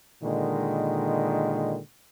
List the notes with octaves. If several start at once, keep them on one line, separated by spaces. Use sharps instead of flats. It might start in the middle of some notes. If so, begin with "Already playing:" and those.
A#2 D3 D#3 G#3